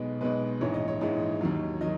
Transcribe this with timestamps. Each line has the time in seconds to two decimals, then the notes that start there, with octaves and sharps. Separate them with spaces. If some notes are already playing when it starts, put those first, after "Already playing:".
Already playing: B1 B2 G#3 B4
0.21 B1 B2 G#3 B4
0.61 A#1 G#2 E3 G#3 C#5
0.74 D#5
0.88 C#5
1.01 A#1 G#2 E3 G#3
1.41 D#2 D#3 F#3
1.81 D#3 F#3 D#5